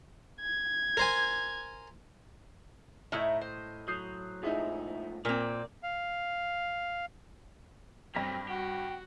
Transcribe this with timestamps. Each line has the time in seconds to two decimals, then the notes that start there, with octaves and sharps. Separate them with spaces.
0.41 G#6
0.97 A#4 C5 G#5
3.12 A2 D#4 E4 C#5 D#5
3.41 C5
3.88 F#3 D#6 G6 C7
4.43 G#2 F3 A3 D#4 E4 G#4
5.25 A#2 A#3 C4 D5
5.83 F5
8.15 G2 F#3 A3 C4 G5 A#6 B6
8.48 F#4 G4 F#5